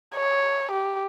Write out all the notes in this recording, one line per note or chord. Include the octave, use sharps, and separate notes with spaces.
C#5
G4